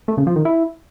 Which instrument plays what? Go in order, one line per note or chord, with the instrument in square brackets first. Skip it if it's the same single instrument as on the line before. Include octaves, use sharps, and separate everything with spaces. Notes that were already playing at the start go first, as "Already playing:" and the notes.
[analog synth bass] A3
C#3
F3
D#3
E4